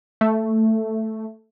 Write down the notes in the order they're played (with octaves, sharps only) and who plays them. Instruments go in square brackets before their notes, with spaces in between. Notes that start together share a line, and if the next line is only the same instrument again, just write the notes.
[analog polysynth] A3